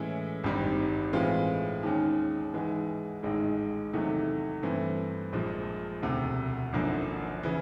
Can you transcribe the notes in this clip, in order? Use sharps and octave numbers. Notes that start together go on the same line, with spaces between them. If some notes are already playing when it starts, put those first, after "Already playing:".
Already playing: A2 E3 G#3 C#4 E4
G#1 G2 D#3 G3 C4
A2 E3 G#3 C4 F4
D#2 D#3 G#3 C#4
G#2 E3 G#3
A1 G#2 D#3 G#3
E2 C3 D#3 F#3 A3
G2 E3 A3 C4
A#1 A#2 F3 G#3
E1 D2 C3
G#1 F#2 D3 F3 A#3
C#3 E3